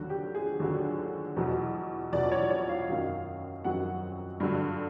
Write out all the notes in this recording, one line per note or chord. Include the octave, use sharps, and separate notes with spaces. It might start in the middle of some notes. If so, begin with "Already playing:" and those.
Already playing: D#2 D3 F#3 F#4
G4
G#4
D#2 D3 F#3
E2 B2 F#3
E2 B2 F#3 D5
C#5
C#5
F5
F#2 D#3 F#3
F#2 D#3 F#3 F#5
G2 D3 F#3